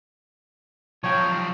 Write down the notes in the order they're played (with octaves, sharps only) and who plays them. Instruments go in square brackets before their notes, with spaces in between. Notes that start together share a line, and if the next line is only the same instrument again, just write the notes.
[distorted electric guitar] F3 F#3 [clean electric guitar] C#5 G5